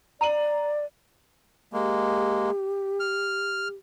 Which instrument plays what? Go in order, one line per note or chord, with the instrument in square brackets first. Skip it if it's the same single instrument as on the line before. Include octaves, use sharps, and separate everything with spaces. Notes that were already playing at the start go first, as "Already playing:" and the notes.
[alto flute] D5 [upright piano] A#5 D#7 F#7
[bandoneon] G#3 A#3 [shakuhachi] G4
[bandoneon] F6